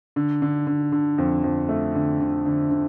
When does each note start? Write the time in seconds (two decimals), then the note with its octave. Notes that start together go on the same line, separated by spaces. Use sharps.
0.16 D3
0.42 D3
0.67 D3
0.92 D3
1.18 F2
1.44 F2
1.69 A3
1.95 D3
2.21 D3
2.46 D3
2.71 D3